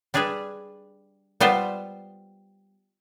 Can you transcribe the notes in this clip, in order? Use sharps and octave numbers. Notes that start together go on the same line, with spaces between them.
G3 D4 G#4 B4
G3 B3 F4 C5